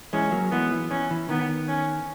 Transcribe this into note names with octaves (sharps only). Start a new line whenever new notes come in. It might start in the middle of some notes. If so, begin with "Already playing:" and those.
E3 G#3 C#4
F#3 A#3
E3 G#3 B3
E3
E3 C#4
E3
D#3 B3
C#4